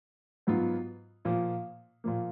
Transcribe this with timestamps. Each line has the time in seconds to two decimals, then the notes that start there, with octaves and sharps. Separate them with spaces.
0.47 G#2 F#3 B3 F4
1.25 A#2 F3 A#3
2.04 A#2 F3 A#3